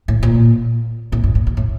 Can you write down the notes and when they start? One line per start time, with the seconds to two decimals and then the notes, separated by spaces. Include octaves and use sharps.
0.08 A2
0.23 A#2
1.12 A2
1.24 G2
1.35 A2
1.47 G2
1.57 A2